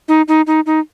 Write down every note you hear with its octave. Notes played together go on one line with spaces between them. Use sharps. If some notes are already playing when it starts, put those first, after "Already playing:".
D#4
D#4
D#4
D#4